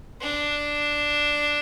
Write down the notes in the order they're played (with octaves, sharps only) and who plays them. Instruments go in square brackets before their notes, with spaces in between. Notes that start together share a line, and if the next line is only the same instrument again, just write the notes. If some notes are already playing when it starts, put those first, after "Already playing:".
[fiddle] D4